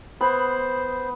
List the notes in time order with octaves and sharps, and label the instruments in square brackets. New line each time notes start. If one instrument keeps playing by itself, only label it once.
[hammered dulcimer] B3 [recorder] C5 [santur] B5